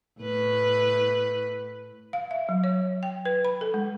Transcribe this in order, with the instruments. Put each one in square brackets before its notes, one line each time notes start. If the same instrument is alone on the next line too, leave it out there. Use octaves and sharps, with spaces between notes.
[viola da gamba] A2 B4
[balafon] F5
E5
F#3
C#5
G5
B4
B5
A4
G#3